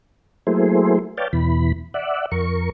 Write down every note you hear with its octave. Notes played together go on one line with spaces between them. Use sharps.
F#3 A3 A#3 E4 G#4 C5
B4 C#5 D5 F5 G5 A5
E2 B2 E3 B5
D5 E5 F#5
F2 A#4 C#6